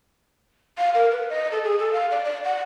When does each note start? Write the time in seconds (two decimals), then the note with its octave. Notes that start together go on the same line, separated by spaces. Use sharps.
0.78 F5
0.94 A#4
1.11 B4
1.29 D#5
1.51 A4
1.64 G#4
1.79 A4
1.93 F5
2.11 D5
2.24 D5
2.44 F#5